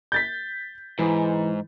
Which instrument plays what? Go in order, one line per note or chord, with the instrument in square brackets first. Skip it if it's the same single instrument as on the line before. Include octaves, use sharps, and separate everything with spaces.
[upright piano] G6 A6 B6
[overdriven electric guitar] G#2 [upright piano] E3